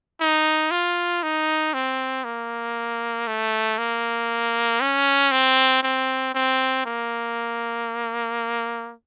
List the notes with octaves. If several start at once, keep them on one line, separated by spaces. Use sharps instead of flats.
D#4
F4
D#4
C4
A#3
A3
A#3
C#4
C4
C4
C4
A#3